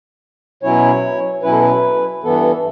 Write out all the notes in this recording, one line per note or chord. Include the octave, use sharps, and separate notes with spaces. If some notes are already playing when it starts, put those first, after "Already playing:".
B2 F#3 C#4 E4 C#5
B2 F#3 C#4 E4 B4
A4
B4
G2 E3 B3 A4